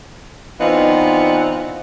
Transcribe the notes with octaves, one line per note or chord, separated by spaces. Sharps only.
E3 B3 C4 D4 D#4 F4